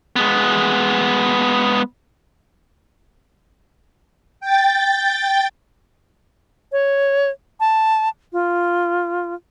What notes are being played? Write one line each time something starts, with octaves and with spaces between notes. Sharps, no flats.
G#3 B3
G5 A6
C#5
A5
F4